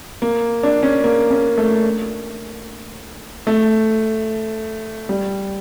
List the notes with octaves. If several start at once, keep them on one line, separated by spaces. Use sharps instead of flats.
A#3
D4
C#4
A#3
C#4
A3
A3
G3